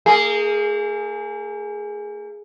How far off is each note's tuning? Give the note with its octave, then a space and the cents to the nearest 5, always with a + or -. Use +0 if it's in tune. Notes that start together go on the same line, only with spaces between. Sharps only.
A#3 -40 G#4 +0